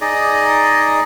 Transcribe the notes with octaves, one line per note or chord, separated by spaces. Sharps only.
D#4 G#4 D5 D#5